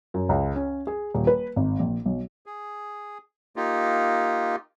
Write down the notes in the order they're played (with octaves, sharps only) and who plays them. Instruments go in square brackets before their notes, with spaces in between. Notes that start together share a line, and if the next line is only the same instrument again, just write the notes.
[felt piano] F#2
C#2
C#4
G#4
D#1
B4
G#1
A#1
B1
[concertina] G#4
A#3 D#4 F4 G4